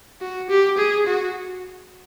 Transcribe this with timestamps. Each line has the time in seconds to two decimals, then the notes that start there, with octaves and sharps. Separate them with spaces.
0.21 F#4
0.49 G4
0.77 G#4
1.06 F#4